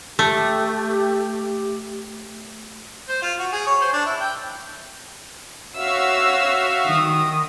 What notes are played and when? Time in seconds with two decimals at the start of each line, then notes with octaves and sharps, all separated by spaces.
0.19 A3 G4
3.09 C5
3.22 F4
3.39 F#4
3.52 G#4
3.66 C#5
3.81 C5
3.93 D4
4.06 E4
4.20 G5
5.75 F#4 C#5 E5 F5 E6
6.88 D#3 D#6